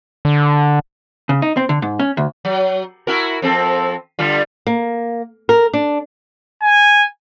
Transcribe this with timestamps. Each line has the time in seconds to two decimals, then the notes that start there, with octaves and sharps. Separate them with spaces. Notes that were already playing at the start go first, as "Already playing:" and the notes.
0.25 D3
1.29 C#3
1.42 D#4
1.57 C4
1.69 D3
1.82 G#2
1.99 C#4
2.17 D2
2.45 F#3
3.07 E4 F#4 A#4
3.42 F2 C4 A4
4.19 D3 G3 F4
4.67 A#3
5.49 A#4
5.73 D4
6.62 G#5